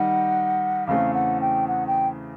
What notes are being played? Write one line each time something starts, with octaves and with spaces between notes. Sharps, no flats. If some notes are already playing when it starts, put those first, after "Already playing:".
Already playing: D#3 G3 D#4 F#5
E2 C#3 E3 A3 C4 F5
F#5
G5
F#5
G5